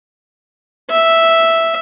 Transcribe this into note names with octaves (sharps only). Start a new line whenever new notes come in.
E5